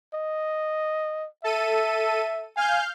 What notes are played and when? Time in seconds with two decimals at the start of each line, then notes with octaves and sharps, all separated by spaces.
0.14 D#5
1.44 A4 E5 D#7
2.57 F5 G#5 F6 G6